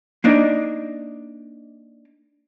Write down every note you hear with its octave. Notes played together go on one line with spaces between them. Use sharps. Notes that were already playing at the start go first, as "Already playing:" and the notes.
A#3 D4 D#4 D5